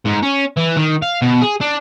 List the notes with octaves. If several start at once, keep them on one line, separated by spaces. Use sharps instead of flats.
G#2
C#4
E3
D#3
F5
B2
G#4
D4